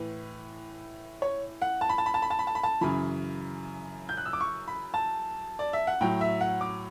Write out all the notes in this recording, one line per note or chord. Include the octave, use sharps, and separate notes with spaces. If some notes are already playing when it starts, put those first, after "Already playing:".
Already playing: A2 E3 B4
C#5
F#5
A5
B5
A5
B5
A5
B5
A5
B5
A5
B5
A5
F#2 C#3 E3 B5
G6
F#6
E6
D6
C#6
B5
A5
D5
E5
F#5
A2 F#3 G5
E5
F#5
D6